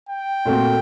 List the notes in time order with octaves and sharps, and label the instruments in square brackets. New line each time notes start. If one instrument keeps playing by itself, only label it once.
[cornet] G5
[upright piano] A#2 A3 C4 F#4